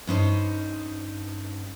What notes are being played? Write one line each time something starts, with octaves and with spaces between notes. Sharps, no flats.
G2 C#4 D#4 C5